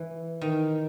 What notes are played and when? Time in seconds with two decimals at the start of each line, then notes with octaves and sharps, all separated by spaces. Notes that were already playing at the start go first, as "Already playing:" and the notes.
Already playing: E3
0.41 D#3